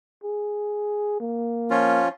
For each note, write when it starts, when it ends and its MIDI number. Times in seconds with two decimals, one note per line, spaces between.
0.24 1.18 68
1.20 2.02 58
1.71 2.08 53
1.71 2.08 61
1.71 2.08 65